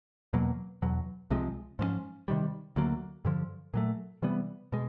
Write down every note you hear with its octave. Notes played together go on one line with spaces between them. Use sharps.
E2 B2 F#3 A#3
E2 B2 F#3
C2 C3 F3 G#3
G#2 F3 G#3 C#4
C3 D#3 G3
D2 D3 F#3 A#3
G2 D3 F3
A#2 F#3 A3
C3 E3 G3 B3
B2 G#3